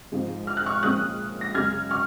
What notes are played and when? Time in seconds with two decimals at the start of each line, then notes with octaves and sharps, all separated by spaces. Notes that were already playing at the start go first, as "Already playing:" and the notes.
0.12 G#2 F3 G#3
0.47 F6
0.57 F#6
0.66 C#6 F6
0.83 A#2 F3 G#3 C#4 D#6 F#6
1.41 A#6
1.55 F#2 C#3 G#3 F6 G#6
1.91 C#6 F6